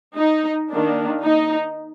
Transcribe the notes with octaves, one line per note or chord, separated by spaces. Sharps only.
D#4
D#3 A#3 D4
D#4